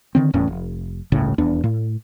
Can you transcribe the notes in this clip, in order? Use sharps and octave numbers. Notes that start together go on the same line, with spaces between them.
D3 D#3 C4
D#1 E2 A2 C#4
F1
G1 C#2 A2 C#3
D#1 E2 B3 D4
A2